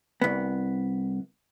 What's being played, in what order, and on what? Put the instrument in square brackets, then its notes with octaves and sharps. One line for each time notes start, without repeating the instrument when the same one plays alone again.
[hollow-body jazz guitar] C2 B3